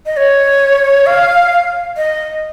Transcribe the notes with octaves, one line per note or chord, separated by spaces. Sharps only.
D#5
C#5
F5
D#5